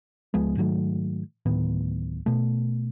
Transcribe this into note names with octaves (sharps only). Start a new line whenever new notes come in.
C#2 F3 G#3 B3
G#2 D#3 F#3 A3
D1 A2 D#3 B3
B2 A3